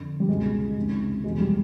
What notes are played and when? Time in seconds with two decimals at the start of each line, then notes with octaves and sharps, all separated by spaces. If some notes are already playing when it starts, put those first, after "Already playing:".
Already playing: F2 D3
0.20 G3
0.28 C#2 B2 G#3
0.76 C#2 C3 D#3
1.24 E2 B2 G#3
1.40 G3